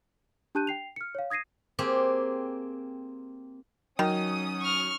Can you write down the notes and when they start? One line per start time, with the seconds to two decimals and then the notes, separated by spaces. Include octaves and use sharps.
0.55 D4 G4 A5 F#6 G6 D#7
0.67 G5 C7 F7
0.96 F6 C#7
1.15 C#5 F5
1.30 D#6 G#6 A#6 C7 D#7
1.79 A#3 C4 G4 G#4
3.99 D#3 F#3 C#4 D#6
4.61 C#6 F6